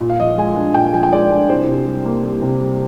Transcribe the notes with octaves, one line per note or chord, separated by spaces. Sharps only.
A#2
F5
F3 D#5
G#3 G#5
D4
A#2 G5
F3 G#5
G5
G#3 D5
D4
C2 C5
C3
G3
A#3
C2
C3
G3